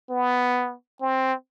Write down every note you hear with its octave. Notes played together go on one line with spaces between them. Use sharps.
B3
C4